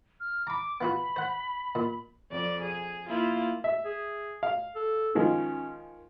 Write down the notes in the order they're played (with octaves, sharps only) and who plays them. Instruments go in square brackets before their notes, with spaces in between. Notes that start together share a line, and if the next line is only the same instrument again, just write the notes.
[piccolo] F6
[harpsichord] A#5 B5 [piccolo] D6
[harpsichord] B3 F4 F#4 [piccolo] B5
[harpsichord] C5 F#5
A#2
[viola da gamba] F2 D5
G#4
A#3 E4 F4
[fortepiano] E5
[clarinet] G#4
[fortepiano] F5
[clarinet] A4
[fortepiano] D#3 F3 G#3 [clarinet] C#4